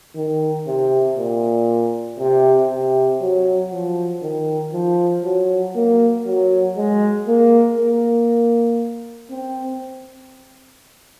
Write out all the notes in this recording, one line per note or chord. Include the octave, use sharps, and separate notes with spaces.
D#3
C3
A#2
C3
C3
F#3
F3
D#3
F3
F#3
A#3
F#3
G#3
A#3
A#3
C4